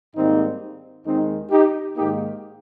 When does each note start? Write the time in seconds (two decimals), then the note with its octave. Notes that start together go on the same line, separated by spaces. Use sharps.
0.14 G#2 D#3 G3 A#3 C4 D#4
1.05 D#2 D#3 G#3 C4 D#4
1.51 D#4 G4
1.96 G#2 D#3 A#3 D#4 G4